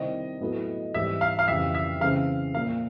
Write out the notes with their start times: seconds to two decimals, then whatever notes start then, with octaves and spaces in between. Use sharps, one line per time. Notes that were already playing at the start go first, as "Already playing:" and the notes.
Already playing: C3 D#3 G3 C4 E4 D#5
0.41 A2 F#3 B3 E4 A4
0.94 G#2 E3 G3 C4 E5
1.21 F5
1.39 F5
1.48 F2 C#3 E3 G3 E5
1.75 E5
2.01 C#3 E3 G#3 C4 F5
2.54 A#2 F3 A#3 F5